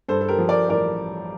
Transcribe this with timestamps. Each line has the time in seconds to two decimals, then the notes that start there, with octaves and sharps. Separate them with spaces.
0.08 G2 A4 C5
0.21 A4
0.28 G4 A#4
0.38 F3
0.49 A#4 D5
0.69 A1 A#4 D5